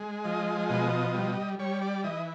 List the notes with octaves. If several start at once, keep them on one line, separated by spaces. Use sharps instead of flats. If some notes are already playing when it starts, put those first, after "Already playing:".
Already playing: G#3
F3 D#5
B2 D#5
G3
G3 C#5
D5
E3 D#5